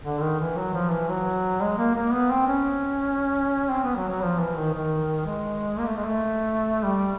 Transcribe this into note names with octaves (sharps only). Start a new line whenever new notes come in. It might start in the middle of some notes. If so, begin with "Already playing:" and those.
D3
D#3
E3
F#3
F3
E3
F#3
G#3
A#3
A#3
B3
C4
C#4
C4
B3
F#3
F#3
F3
E3
D#3
D#3
G#3
A#3
A3
G#3
A3
G3